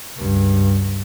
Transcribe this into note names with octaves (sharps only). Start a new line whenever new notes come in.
C#2 G2